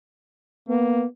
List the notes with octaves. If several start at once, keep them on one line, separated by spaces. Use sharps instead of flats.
A#3 B3